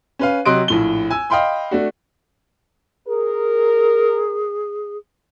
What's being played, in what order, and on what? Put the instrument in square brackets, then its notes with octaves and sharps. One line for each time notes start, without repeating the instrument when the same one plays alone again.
[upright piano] C#4 B4 F5
C3 F#3 D#5 C6 F#6 D7
A#1 A2 G7
G#5 E6
D#5 F5 G5 B5 C6
A3 D4 F#4
[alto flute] G#4 [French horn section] A#4